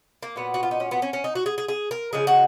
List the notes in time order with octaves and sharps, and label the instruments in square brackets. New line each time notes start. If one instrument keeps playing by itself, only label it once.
[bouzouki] A#3
A#2 F#3 B3
F#4
F4
D#4
C#4
B3
C#4
C#4
D#4
F#4
G#4
G#4
G#4
A#4
C#3 F3 G#3 G#4
F#4